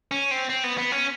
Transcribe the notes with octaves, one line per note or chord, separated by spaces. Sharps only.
C#4
C4
C4
B3
B3
C#4